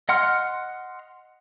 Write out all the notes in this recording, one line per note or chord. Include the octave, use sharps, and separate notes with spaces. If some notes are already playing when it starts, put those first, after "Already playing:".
D#5 F#5 C6 F6